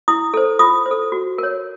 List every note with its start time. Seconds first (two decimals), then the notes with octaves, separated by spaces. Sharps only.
0.08 E4 D#6
0.34 A4 C5
0.59 F4 D#6
0.86 C5
0.91 A4
1.12 F#4
1.38 A#4 C#5